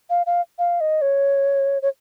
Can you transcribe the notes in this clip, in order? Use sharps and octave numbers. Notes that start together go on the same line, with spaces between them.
F5
F5
F5
D#5
C#5
C#5